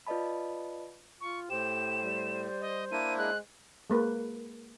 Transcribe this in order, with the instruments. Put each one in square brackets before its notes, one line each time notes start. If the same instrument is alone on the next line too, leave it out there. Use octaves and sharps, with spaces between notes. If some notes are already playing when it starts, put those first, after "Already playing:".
[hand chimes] F4 B4 D5 D#5 A5 B5
[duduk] F4 [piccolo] C#6
[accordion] A2 [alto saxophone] G4 [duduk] C5 [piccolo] E7
[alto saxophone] G3
[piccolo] D#5
[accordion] A#3 D4 E4 [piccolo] D#7
[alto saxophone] G#3 [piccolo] F#6
[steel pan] G#3 A#3 B4